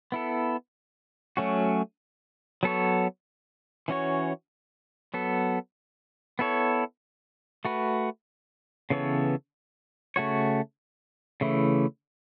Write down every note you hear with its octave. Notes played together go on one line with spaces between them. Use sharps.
B3 E4 A4
F#3 A3 C#4 F#4
F#3 B3 A4 C#5
E3 C#4 F#4 C#5
F#3 B3 A4
B3 E4 A4 C#5
A3 F#4 B4
C#3 E3 B3 A4 C#5
C#3 A3 F#4 C#5
C#3 E3 A3 E4